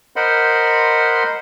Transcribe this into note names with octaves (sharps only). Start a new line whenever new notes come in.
A#4 C5 D#5 F#5 B5 C6